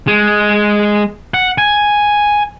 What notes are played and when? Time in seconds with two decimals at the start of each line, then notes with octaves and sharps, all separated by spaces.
0.08 G#3
1.34 F#5
1.58 G#5